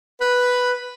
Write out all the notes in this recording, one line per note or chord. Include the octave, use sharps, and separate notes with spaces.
B4